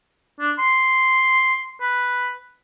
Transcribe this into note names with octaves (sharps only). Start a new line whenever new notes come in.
D4
C6
B4